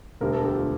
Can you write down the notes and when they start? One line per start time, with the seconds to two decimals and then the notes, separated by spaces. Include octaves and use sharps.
0.21 E1 D2 D3 G3 A#4
0.33 A4
0.45 G4
0.56 F4